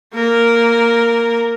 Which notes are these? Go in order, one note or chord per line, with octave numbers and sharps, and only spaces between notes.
A#3 A#4